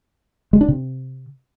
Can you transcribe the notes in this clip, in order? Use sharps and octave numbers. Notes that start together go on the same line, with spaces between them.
G#3
D4
C3